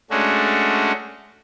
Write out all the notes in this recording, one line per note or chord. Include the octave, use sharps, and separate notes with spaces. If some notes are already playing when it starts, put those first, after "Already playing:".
G#3 A3 C#4 D4 F#4